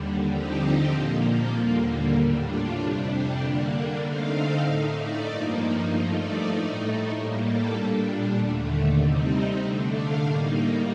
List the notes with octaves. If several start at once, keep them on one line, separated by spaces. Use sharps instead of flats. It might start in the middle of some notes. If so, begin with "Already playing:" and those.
Already playing: D#2 D3 G3
D3 F3 C4 D#4 G4
A#2 F3 A#3 G4
F4
D#2 D3 G3 A#3
A2 G3 D4
F4
F2 C3 G3 D4
G4
D3 G3 A#3 D4
D3 A3 C4 D#4 F5
A2 A3 D#4 D#5
D5
G2 F3 A#3 D#4
G2 F3 A3 D#4
D5
A2 A3 D#4
A2 G3 A#3 A#4
A4
A#2 G3 D4
D#2 D3 A3
C3 G3 C4 D#4
D3 A3 D4
F5
A2 G3 A#3 D#4